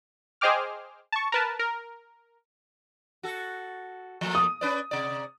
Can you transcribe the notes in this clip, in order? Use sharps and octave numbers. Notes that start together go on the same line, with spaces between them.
G#4 C5 D#5 G5 D6 F6
A5 C#6
A#4 B4 A5
A#4
F#4 A4
F3 A3 A#3
D#6
C#4 B4 D5
C3 D5